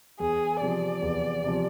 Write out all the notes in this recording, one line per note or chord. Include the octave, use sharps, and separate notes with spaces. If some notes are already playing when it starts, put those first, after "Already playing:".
E2 G#4
C3 F3 D5
E2
C3 F3